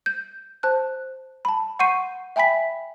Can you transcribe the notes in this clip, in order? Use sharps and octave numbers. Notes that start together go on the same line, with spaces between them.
G6
C5 A5 F#6
A5 B5
F#5 C6 C#6 G6 C7 D#7
E5 G5 G#5 B5 B6